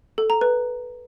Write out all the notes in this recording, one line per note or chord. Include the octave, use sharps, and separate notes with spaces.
A4
A#5
B4